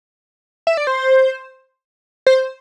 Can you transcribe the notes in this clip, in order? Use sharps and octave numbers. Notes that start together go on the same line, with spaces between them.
E5
D5
C5
C5